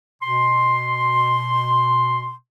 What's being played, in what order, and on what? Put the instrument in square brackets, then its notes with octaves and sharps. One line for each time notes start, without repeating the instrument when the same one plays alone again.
[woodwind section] B2 C6